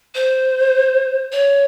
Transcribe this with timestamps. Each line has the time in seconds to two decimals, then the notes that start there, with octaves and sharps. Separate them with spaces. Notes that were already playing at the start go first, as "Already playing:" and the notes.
0.15 C5
1.32 C#5